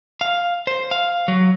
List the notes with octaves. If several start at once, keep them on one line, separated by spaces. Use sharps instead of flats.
F5
C5
F5
F#3